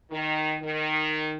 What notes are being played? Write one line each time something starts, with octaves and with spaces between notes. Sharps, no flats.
D#3
D#3